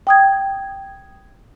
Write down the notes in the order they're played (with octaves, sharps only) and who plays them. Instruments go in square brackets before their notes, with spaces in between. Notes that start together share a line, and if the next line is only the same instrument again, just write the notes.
[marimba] G5 D#6 G#6